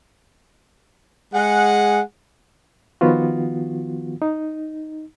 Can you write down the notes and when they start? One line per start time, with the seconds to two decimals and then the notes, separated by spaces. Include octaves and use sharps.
1.34 G#3 G#4 F#5
3.01 D#3 F3 B3 F4 F#4
4.22 D#4